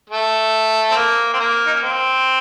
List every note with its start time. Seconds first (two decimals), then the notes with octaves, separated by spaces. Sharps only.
0.10 A3
0.91 C4
0.96 A#3
1.34 C4
1.40 A#3
1.67 D#4
1.74 C#4
1.83 C4